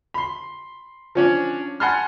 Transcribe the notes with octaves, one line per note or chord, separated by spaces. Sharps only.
B5 C6
F3 C#4 D4
F#5 G#5 A5 B5 C6 F6